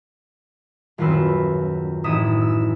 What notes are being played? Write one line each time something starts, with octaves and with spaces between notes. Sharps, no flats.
D#1 F#2 F4 F#4 B4 E6
A1 D#4 D#6 B6 E7
E6